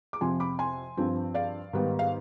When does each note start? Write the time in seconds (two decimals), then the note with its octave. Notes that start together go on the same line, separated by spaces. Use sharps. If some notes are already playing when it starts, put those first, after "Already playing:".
0.13 D6
0.21 F2 C3 F3 C4 G#5 C6
0.40 B5 D6
0.59 G#5 C6
0.97 G2 F3 C4
1.34 D5 F5
1.73 G#2 D#3 G3 B3
1.99 F5